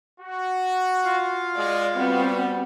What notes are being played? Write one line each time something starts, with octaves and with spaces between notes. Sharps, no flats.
F#4
F4 F5
G#3 D5
G3 B3 C4 F#4